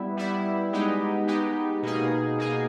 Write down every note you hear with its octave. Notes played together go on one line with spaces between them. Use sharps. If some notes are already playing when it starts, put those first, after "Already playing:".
Already playing: G3 B3 E4
G3 B3 E4
G#3 B3 D#4 G4
G#3 B3 D#4 G4
B2 A#3 D#4 G#4
B2 A#3 D#4 G#4